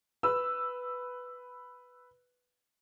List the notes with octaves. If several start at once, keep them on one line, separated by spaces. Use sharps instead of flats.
B4 E6